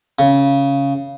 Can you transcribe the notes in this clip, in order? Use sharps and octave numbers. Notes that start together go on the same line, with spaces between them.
C#3